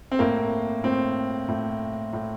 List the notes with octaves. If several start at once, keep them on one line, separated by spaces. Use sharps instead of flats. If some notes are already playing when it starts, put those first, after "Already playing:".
C4
A2 A#3
A2 C4
A2
A2